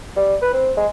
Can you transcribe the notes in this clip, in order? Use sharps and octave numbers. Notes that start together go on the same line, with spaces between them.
G3
B4
C4
G#3